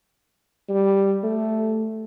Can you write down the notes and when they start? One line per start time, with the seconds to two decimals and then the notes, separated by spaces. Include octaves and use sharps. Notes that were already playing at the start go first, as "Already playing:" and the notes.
0.69 G3
1.23 A3